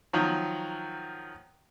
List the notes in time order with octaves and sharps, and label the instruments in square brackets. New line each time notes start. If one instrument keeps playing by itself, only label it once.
[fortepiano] D#3 F3 F#3